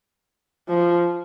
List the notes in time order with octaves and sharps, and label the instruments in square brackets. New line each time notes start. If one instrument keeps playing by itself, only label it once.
[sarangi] F3